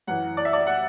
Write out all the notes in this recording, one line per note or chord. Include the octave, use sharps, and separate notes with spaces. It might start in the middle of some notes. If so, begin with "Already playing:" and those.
F#2 E3 F#5
D5
E5
D5
F#5